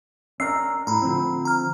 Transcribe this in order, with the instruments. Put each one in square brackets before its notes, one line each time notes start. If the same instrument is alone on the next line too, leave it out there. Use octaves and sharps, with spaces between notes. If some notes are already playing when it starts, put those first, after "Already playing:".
[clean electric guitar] C#4 D4 A#4 [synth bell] E6 C7
[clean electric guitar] A2 [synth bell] A#5 B5
[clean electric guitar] D3 F3 C4
[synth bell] A#5 F6